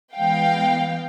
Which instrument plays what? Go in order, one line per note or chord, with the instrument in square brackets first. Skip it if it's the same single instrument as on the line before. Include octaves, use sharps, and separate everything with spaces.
[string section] E3 G#3 B3 F5 G5